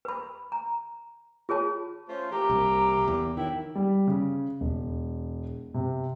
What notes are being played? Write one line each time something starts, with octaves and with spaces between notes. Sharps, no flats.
B4 B5
A#5
F4 G#4 C#5 A5
A3 C#4 F4 C5
E3 A#3 G4 A#5
C2
E2
D#3 F#3 E4 G5
G3
C#3
E1
C3